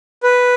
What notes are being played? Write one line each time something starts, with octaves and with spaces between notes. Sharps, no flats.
B4